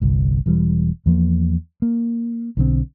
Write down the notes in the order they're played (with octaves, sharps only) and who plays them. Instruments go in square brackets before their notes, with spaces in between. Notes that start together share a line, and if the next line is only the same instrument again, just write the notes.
[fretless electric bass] G1 C2
E1 E3 G3
E2 F3 A#3
A#3
B1 D3 D#3 C4